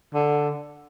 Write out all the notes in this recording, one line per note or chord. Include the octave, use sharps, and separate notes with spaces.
D3